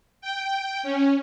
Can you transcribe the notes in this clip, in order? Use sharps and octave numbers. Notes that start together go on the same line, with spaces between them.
G5
C#4